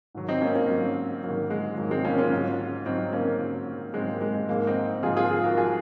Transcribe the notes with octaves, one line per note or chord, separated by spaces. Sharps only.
G#2 D#3 F#3
C4 D#4
A#3 C#4
A#3 C#4
G#2 D#3 F#3
G#2 D#3 F#3 A#3
G#3
G#2 D#3 F#3 A#3
G#3 C4
A#3 C#4
C#4 F4
G#2 F#3
G#2 F#3 C4 D#4
A#3 C#4
G#2 F#3
G#2 F#3 G#3 C4
A#3
G#3
G#3
G#2 F3 A#3
C4 D#4
G#2 F3 F4 G#4
F4 G#4
F4 G#4
F#4 A#4
F3 F4 G#4